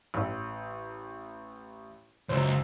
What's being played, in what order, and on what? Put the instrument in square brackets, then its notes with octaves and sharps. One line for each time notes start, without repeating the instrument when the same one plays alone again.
[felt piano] A1
[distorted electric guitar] C#2 [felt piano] F#2 C5